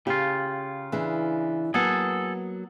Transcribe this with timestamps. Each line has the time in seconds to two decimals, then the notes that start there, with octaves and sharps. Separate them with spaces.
0.07 C#3 F4 G4
0.92 E3 D4 G#4
1.74 F#3 A#3 B3 G#4 A4